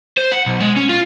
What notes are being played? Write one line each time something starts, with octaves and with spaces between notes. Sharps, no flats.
C5
F#5
B1
G#3
C#4
F4